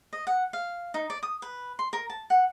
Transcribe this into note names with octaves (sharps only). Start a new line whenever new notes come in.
D#5
F#5
F5
D#4
D5
D#6
B4
C6
A#4
A5
F#5